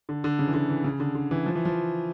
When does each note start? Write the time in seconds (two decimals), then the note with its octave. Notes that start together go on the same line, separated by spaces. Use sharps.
0.09 D3
0.24 D3
0.39 C#3
0.47 E3
0.54 D3
0.70 E3
0.84 C#3
1.00 D3
1.15 D3
1.31 E3
1.46 F3
1.55 E3
1.65 F3